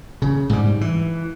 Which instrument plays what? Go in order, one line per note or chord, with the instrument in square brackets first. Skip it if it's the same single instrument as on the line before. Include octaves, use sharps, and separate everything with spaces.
[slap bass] C#3
G#2 G3
E3